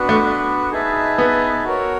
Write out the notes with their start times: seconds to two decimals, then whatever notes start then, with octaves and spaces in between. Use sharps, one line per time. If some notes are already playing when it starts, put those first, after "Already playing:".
Already playing: B3 D4 F#4 B4
0.09 A3
0.71 D#4 G#4 B4 E5 A5
1.18 B3
1.64 F#4 A#4 C#5